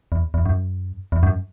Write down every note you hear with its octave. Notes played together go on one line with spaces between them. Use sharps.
E2
E2
F#2
E2
F#2